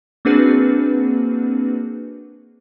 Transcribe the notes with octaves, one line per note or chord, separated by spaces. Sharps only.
A#3 C4 D4 F#4 G#4 B4